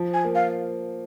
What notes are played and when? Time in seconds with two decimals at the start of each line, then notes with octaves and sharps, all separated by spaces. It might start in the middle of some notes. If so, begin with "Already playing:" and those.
Already playing: F3
0.14 G#5
0.25 A#3
0.35 F5